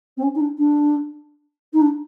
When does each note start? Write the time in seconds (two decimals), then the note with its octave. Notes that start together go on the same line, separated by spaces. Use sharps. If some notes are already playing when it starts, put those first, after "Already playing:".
0.17 C4
0.22 C#4
0.35 D#4
0.39 D4
0.57 D4
1.73 D#4
1.80 D4